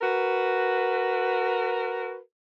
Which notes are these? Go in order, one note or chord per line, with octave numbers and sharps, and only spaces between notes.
F#4 A#4 B4